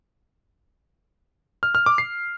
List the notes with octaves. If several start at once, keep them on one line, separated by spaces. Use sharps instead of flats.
F6
F6
D6
C7